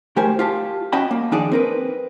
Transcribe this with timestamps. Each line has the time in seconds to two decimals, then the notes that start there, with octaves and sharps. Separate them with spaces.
0.16 D2 A3 G4 A#4 C5 G#5
0.39 F4 G4 A5
0.92 C#4 F#4 D#5 G5 A5 B5
1.11 A#3
1.32 D#3 F3 D4 D#4 G#4 D5
1.52 C4 A#4 B4